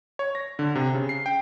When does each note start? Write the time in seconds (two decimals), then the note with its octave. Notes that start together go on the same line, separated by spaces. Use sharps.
0.19 C#5
0.35 A#6
0.59 D3
0.75 C3
0.95 C#3
1.09 C7
1.26 G5